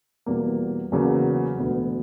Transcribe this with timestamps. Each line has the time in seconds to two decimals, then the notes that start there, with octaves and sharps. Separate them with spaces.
0.26 E2 B2 G3 A#3
0.92 E2 C#3 F#3 A#3
1.58 E1 D2 D3 F#3 B3